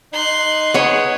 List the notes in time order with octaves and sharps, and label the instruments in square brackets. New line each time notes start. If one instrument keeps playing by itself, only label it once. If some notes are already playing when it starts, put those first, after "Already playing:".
[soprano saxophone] D#4 [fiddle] C6 F#6
[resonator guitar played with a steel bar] B3 C#5 [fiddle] G#4